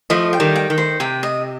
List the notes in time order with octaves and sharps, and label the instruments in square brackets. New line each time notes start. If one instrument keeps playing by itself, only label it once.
[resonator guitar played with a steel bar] F3 A3 [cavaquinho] D#5
[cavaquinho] G5
[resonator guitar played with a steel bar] D#3 G3
[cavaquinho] G5
[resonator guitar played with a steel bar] D#3
[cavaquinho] C5
[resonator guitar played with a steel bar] C3 [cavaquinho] G5
[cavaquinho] D#5